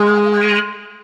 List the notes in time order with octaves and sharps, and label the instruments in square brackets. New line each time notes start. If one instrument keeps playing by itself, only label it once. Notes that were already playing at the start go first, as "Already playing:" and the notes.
Already playing: [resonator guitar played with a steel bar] G#3